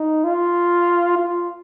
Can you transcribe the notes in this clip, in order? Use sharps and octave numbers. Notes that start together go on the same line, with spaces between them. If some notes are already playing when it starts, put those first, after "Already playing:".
Already playing: D#4
F4
F4